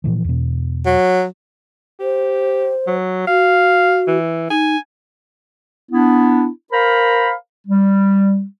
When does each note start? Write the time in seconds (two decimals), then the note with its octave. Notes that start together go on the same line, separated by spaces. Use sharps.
0.04 A#2 E3 F3
0.24 E2 B2
0.86 F#3
2.00 G4 C5
2.87 F#3
3.27 F#4 F5
4.07 E3
4.50 D#4 G#5
5.90 B3 D4 E4
6.71 A#4 C5 F5 A#5 B5
7.67 G3